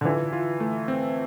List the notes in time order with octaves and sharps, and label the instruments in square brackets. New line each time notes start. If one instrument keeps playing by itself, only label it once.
[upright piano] D3
[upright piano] E3 [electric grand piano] F4
[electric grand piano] F4
A3
C4